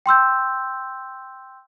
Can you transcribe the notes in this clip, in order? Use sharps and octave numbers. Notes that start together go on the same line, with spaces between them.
G5 C6 E6 G6